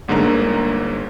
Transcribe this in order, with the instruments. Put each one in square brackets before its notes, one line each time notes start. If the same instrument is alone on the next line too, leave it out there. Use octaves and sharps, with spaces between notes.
[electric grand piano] G1 G#2 D3 A#3 A#5